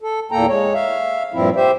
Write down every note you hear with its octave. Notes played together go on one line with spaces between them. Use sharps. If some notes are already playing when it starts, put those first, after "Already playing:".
A4
E2 A#2 A#3 A4 G5 A#5
G#3 C#5
E5 F5
G2 A#2 F3 C4 E4
G4 C5 E5